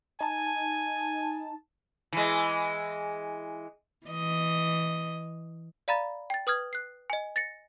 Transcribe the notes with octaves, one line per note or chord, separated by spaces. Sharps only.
D#4 G#5 A5
E3 G#3
E3 D#5
D5 F5 A#5 B5 A6
G5 A6
B4 D#6 F6 G#6
F#6 C7
D#5 G#5
A6 A#6 C#7